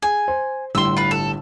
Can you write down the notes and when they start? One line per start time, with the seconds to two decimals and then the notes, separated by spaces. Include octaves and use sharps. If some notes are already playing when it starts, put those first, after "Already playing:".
0.02 G#4 G#5
0.28 C5
0.75 G1 A2 G3 C6 E6
0.97 F4 B4
1.11 A4